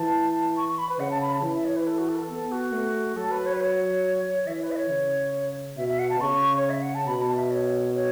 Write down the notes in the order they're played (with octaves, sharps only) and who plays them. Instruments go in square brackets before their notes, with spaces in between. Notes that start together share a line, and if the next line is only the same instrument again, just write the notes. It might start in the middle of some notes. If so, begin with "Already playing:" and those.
Already playing: [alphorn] E3 [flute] A5
[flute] C#6
C#6
B5
B4
[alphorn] C#3 [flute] F#5
[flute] A5
B5
A5
[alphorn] E3
[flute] E5
C#5
B4
A4
F#4
A4
B4
A4
[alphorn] B3 [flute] A4
[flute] F#4
[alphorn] A3
[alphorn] F#3 [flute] A4
[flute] B4
C#5
B4
C#5
[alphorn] E3 [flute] E5
[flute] C#5
B4
E5
C#5
[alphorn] C#3
[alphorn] B2 [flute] E5
[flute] E5
F#5
A5
[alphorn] C#3 [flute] C#6
[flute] C#5
E5
F#5
A5
[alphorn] B2 [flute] B5
[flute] A5
E5
C#5
C#5